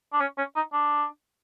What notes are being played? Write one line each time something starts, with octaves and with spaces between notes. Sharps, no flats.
D4
C#4
C#4
D#4
D4